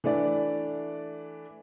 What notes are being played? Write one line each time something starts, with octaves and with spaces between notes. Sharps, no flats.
E3 A3 D4 D5